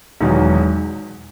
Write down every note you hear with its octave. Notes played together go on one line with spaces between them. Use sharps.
E1 E2 D#3 F#3